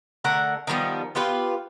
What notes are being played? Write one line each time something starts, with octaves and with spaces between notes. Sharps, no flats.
D3 A3 A#4 F#5
D#3 F3 G3 B3
B3 F4 G4 B4